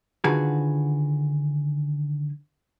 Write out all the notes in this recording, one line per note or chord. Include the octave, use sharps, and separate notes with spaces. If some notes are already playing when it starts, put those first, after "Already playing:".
D3 D#3 F4 F#4 G#4 B4